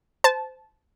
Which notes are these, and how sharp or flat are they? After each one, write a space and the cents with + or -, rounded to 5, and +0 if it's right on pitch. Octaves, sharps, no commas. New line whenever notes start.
C5 -20 A5 -15